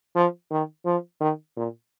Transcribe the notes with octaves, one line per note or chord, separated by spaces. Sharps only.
F3
D#3
F3
D#3
A#2